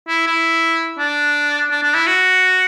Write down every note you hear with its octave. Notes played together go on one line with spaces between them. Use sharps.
E4
E4
D4
D4
D4
E4
F#4